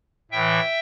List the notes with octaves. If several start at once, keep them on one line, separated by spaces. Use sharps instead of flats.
A2 E3 E5 G5